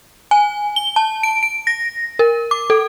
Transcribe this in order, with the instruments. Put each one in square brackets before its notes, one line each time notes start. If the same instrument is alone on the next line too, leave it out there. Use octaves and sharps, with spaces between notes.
[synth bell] G#5
G7
A5
D7
D7
A#6
A#4
D6
A4